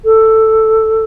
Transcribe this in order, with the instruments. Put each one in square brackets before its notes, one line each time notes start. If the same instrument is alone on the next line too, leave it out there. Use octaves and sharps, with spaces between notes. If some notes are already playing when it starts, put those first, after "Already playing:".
[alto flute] A4